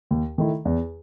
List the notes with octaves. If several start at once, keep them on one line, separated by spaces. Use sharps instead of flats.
D#2
D#3 A3 E4
E2